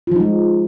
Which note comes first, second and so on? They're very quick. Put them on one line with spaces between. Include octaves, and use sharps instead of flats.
F4 F3 D#4 G#3